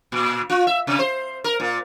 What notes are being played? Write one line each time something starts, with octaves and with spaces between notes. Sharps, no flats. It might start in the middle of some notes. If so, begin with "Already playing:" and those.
A#2
F4
E5
C3
C5
A#4
A#2